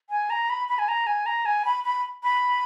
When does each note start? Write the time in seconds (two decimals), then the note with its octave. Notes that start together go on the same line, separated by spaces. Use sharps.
0.10 G#5
0.30 A#5
0.50 B5
0.69 B5
0.79 G#5
0.88 A#5
1.07 G#5
1.26 A#5
1.46 G#5
1.65 B5
1.85 B5
2.23 B5